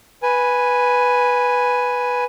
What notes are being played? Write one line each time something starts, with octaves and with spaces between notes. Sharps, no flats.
B4 G#5